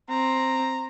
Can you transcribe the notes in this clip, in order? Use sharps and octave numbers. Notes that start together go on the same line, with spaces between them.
C4 A#5